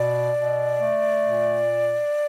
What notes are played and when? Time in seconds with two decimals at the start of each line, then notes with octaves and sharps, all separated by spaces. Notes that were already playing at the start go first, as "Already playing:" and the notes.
Already playing: B2 D5
0.36 B2
0.80 A3
1.24 A#2